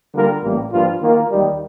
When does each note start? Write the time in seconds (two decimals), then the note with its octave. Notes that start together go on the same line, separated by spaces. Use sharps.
0.13 D3 G3 A#3 F4 A#4
0.43 A1 A2 G3 A#3
0.72 G2 F3 A#3 F4
1.00 D#3 A#3 F4 A#4
1.30 D#2 D#3 G3